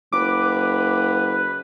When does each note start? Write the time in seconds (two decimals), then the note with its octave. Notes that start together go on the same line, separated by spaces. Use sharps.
0.13 F#1 B4 D6